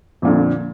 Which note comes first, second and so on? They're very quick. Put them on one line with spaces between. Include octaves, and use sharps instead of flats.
F2 A#2 D3